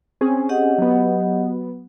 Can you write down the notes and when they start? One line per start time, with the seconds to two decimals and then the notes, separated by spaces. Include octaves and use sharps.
0.21 C4 C#4 G#4
0.49 G4 D#5 F#5
0.78 F#3 B3